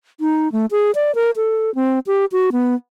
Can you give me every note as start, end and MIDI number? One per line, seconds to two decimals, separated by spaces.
0.20 0.51 63
0.52 0.66 57
0.71 0.91 68
0.95 1.14 74
1.15 1.31 70
1.36 1.73 69
1.75 1.99 60
2.07 2.25 67
2.32 2.50 66
2.52 2.75 59